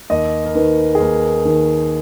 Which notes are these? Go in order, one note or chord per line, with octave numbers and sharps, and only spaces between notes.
D#2 D#5
A#4
D#3 B4
G#4
D#2 A#4
D#3